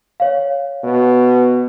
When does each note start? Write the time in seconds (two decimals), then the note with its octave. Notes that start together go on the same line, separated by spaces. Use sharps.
0.20 C#5 F5
0.84 B2